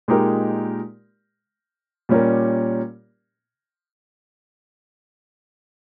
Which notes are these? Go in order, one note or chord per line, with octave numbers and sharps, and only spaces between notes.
A#2 G#3 D#4 G4 A#4
A#2 G3 C#4 G4 A#4